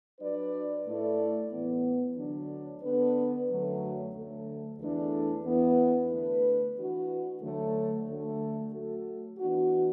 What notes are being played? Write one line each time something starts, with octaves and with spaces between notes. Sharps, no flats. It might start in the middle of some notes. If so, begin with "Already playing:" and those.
F#3 D4 B4 D5
A2 A3 E4 A4 D5
A2 E3 B3
D2 D3 F#3 D4
D3 B3 D4 B4
F#2 D3 F#3 A3
D2 D3 A3
E2 E3 A3 D4 A4
E2 E3 B3
D3 A3 D4 B4
E3 D4 F#4
D2 D3 F#3 A3
D2 D3 A3
F#3 A3 F#4 A4
E3 B3 D4 F#4